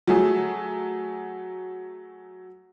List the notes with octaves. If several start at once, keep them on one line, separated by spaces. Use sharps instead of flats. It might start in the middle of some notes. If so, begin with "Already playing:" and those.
F#3 A3 G#4